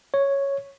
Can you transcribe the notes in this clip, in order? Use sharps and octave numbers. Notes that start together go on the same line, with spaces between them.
C#5